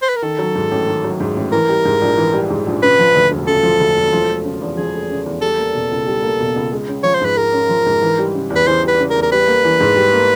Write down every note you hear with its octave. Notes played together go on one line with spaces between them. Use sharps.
C5
B4
A#4
D#3 A4
F#3
G#2
A1
D#3
F#3
G#2
A1
E3 A#4
G3
G#2
A#1
E3
G3
G#2
A#1
C#3 B4
F3
D2
E1
C#3 A4
F3
D2
E1
F3
A3
C#3
E2
F3 G#4
A3
C#3
E2
G3 A4
A#3
B2
C#2
G3
A#3
B2
C#2
G#3
C#4
F3 C#5
C5
G#2 B4
G#3 A#4
C#4
F3
G#2
E3
G3
C#3
E2
B4
E3 C5
G3 B4
C#3
A#4
E2
A#4
G3 B4
A#3
E3
G#2
G3
A#3